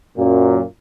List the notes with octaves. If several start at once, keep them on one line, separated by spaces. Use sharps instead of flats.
F#2 A#2